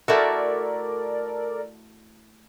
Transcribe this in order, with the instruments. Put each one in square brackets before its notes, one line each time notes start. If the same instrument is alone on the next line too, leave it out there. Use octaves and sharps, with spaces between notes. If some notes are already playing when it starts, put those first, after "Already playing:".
[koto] A3 E4 F#4 [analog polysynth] A4 A#4 D5